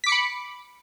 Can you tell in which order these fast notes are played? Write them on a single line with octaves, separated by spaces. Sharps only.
B6 D6 C#7 B5